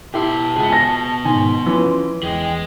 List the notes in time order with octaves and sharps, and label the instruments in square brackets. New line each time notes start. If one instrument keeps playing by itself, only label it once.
[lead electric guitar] B2 C6 [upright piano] E4 G4 [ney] A5
[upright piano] C#2 [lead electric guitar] G#4 E5
[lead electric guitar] B3 F#4 [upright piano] G#5 A#6
[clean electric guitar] G#2 B2 D#3 [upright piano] G#5 [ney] C6
[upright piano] E3 [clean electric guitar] F3 C#4
[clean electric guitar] E2 [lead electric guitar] G#4 D#5 [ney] G5